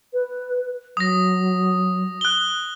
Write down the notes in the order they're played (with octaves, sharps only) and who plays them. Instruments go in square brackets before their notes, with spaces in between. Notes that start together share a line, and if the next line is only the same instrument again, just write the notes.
[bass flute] B4
[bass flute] F#3 [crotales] D#6 A#6
[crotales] F#6 G7